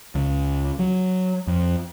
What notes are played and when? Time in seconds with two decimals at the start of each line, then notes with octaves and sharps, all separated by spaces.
0.15 C#2
0.79 F#3
1.47 F2